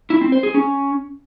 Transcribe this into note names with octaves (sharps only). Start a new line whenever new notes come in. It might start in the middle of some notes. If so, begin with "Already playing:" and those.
E4
C4
C5
G#4
C#4